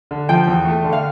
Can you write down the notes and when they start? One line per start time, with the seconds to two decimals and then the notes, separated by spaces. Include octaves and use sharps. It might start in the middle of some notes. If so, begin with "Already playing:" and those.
0.11 D3
0.29 F3 G5
0.48 E2
0.65 A3
0.84 D3
0.93 F5